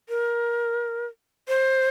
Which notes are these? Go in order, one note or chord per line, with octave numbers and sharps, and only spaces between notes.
A#4
C5